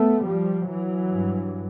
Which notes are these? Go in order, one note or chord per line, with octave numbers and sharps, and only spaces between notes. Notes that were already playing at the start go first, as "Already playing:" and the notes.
Already playing: A3 B3
F3 G3
E3 F#3
G2